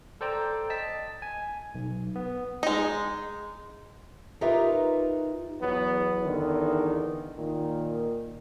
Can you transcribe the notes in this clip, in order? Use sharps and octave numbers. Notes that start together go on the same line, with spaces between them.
A4 C5 D5 G5 A#5
D#5 A5 B6
G#5
B1
B3
G#3 D#4
D#4 F4 G4 A#4 B4 E5
E2 F#3 B3
E2 D3 D#3
A#2 D#3